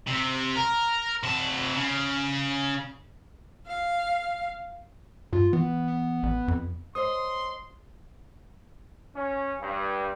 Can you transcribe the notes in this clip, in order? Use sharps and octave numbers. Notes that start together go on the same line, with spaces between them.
C3
A#4
C3 A5
C#3
F5
G2 F4
E3 B3
B3
A1
F2
C5 C#5 D#5 C6 D#6
C#4
G2